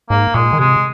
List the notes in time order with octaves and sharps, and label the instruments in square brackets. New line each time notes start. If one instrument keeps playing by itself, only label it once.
[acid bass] G#2 [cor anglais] A#3
[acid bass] A#2 [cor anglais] G#3
[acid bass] D#3
[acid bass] C3 [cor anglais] G#3